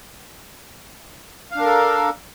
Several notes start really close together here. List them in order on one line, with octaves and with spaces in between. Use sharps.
F5 D4 A#4 A4